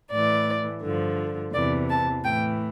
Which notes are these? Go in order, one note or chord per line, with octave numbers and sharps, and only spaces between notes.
A2 E3 D5
G2 D3 F3
E2 C3 E3 D5
A5
A2 E3 G5